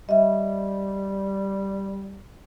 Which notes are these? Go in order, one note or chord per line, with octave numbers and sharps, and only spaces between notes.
G3 D#5 E5